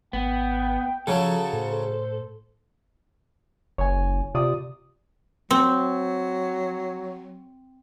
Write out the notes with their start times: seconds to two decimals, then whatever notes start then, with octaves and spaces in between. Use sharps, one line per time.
0.13 G#1 B3 G5
1.07 C#3 F3 F#3 A4
1.53 A2 C5
3.78 F#1 C#5 G#5
4.35 C3 F4 D5 D#6
5.51 F#3 C4